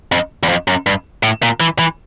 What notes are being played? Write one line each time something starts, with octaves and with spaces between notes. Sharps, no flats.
F2
E2
F2
F#2
G2
A2
A#2
E3
E3